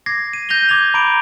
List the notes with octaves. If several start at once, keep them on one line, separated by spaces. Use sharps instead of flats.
D6 G#6 A#6 C7
D#7
G6 A#6 D#7 F7 G7
D6 G#6 A6 F7
A#5 B5 D6 D7